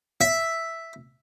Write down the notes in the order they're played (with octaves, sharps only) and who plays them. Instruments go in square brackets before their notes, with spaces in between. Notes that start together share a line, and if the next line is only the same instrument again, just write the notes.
[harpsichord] E5